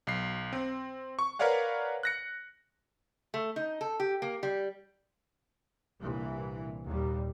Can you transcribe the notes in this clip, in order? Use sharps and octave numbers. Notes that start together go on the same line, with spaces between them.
B1 C7
C4
C#6
A#4 B4 C#5 D5 F5 F#5
F#6 A#6 C#7
A3
D#4
A4
G4
A#3
G3
C2 G2 A#2 E3
D#2 A#2 G3